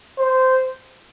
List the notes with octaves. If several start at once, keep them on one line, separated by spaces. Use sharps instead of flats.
C5